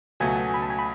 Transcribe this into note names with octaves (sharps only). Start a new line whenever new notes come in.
C#2 B2 F#3 A3 G#5
B5
A5
G#5
B5